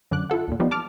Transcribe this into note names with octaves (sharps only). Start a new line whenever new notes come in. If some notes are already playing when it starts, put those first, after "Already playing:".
F#2 D3 D6 F#6
E4 F4 A4 F#5
D#2 A#2
F3 G3 B3 D#4
A5 D6 F6